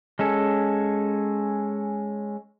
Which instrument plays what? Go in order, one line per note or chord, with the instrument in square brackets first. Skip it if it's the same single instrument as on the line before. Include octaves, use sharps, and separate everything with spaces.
[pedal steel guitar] G#3 C#4 A4